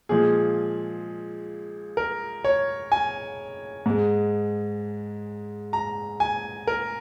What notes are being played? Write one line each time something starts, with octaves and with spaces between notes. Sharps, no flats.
A#2 F3 G#3 G#4
A#4
C#5
G#5
G#2 G#3
A#5
G#5
A#4